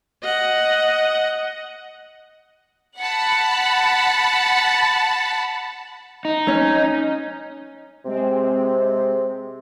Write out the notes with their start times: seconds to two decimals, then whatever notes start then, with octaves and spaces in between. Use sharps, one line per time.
0.23 D#5 F#5
2.98 F#5 A5 B5
6.25 D#4
6.48 C#4
8.05 C3 G#3 C4